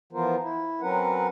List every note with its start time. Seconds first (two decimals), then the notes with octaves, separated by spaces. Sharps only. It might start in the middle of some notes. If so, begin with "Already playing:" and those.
0.13 E3 F3 B3 F4 A#4 C5
0.41 E4
0.81 F#3 C4 C#4 A#4 B4 F#5